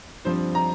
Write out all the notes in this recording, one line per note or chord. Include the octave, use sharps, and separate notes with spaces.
G2 F3 C4 C5
A#5